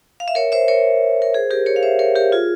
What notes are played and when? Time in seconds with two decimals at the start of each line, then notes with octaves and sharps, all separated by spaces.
0.20 F5
0.28 E5
0.35 A#4 C#5
0.52 C5 E5
0.68 A#4 C#5
1.22 A#4
1.34 G#4 C5
1.51 G4 A#4
1.66 A#4 C#5
1.76 F5
1.83 C5 E5
1.99 A#4 C#5
2.16 G4 A#4
2.32 F4 G#4